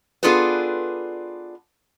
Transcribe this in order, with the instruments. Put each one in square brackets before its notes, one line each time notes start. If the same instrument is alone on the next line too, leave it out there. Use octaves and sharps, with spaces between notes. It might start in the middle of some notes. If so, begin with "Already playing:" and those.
[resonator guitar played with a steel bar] B3 D4 F4 G#4 A4 B4